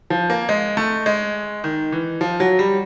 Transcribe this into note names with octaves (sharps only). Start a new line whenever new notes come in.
F3
A#3
G#3
A3
G#3
D#3
E3
F3
F#3
G3